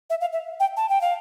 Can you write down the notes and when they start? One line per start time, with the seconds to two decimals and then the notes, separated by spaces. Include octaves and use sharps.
0.10 E5
0.21 F5
0.33 E5
0.60 G5
0.77 A5
0.89 G5
1.01 F5